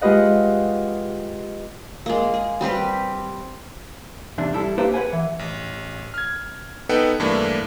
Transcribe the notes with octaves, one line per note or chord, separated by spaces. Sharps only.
G#3 F4 G4 B4 D#5 F#5
G#3 A#3
G#4
G3 C4 G4 B4
E2 C3 D4
G3 E4 A4
A#3 D4 E4 G4 B4 C5
G#4 B4 C5 F#5 G#5
E3
A1
F6 G#6
B3 D#4 A4 B4 F#5 G5
G2 E3 A3 A#3 D4